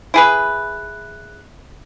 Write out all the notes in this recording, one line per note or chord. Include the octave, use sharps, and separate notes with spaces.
E4 G#4 B4